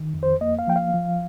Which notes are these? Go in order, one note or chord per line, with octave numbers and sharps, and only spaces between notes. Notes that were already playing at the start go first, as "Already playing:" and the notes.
Already playing: D#3
F2
C5
A#3 D#5
F5
F3 G5
F5
F3